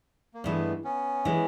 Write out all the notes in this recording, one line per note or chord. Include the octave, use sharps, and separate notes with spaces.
A#3
G2 E3 G#3 A3 B3
B3 C#4
E3 G#3